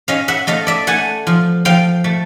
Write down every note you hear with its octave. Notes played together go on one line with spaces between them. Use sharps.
C#4 D#5 F5
E5 F#5
A3 D#5 F5
D5 E5
A3 F#5 G#5
F3
F3 F5 G5
A3